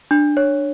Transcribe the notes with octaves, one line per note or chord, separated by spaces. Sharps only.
D4
C#5